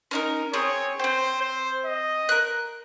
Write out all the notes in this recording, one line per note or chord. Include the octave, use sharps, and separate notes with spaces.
C#4 D#4 A#4
C4 G#4 C#5 D#6
C4 C5 G5
C5
D#5
A#4 F#6